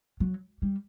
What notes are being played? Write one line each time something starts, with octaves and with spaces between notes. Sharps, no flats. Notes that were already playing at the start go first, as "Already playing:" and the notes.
F#3
G3